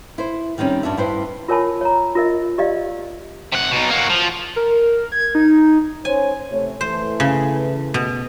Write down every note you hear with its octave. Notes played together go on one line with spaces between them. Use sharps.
E4 C5
D#3 G3 C4 C#4
G2 D4 F#4 E5
G2 E4 B4 C5
F4 A#4 C#5 G#5 A5 B5
C#5 A#5
F4 A#4 D#5
G4 D5 D#5 F5
C3 F#5
B2 D#4
A#3 F#4
F3
A#4
G#6
D#4
C#4 C5 C#5 G#5
C3 A3 C#5
E3 A3 C5
C#3
B2